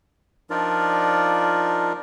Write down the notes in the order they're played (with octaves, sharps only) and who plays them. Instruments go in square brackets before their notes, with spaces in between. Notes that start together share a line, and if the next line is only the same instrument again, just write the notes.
[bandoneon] F3 D4 D#4 F4 A#4 D5